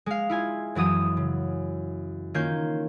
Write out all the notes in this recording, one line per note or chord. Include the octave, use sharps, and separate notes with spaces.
G#3 F5
E4 F4 G#5
F#2 E3 F#3 D#6 D#7
C#3
D#3 A#3 C#4 F4 G6